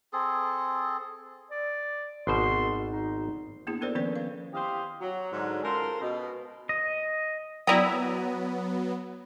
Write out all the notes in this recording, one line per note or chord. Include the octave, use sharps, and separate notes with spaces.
C4 G#4 A4
D5
G#1 B2 C5 C6
D#4
A#3 B3 D4 E4 G#4
B3 A4 A#4 C5 D5
D#3 F3 B3 C#4 C5 D5
F5
E4 G4 C5 D#5 F5
F#3
G#2 D3 F#3
G#3 C#4 F4 A4 A#4 C5
B2
D#5
F#3 B3 E4 D5 G5 A#5 D#6